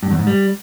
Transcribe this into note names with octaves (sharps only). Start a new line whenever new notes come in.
G2
E2
G#2
G3